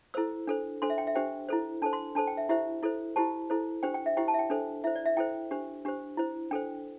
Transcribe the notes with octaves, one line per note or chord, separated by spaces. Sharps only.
E4 A4 C5 E6
D4 A4 C5
D4 A4 C5 C6
E5
G5
E5
D4 G4 C5 G5
E4 A4 C5
D4 A4 C5 A5
C6
D4 A4 C5 A5
G5
E5
E4 G4 C5 E5
E4 A4 C5
E4 G4 C5 A5
E4 A4 C5
D4 G4 C5 G5
G5
E5
E4 G4 C5 G5
A5
E5
G5
D4 A4 C5
E4 C5 E5
D5
E5
E4 A4 C5 G5
D4 G4 C5
D4 G4 C5
E4 C5
D4 A4 C5 G5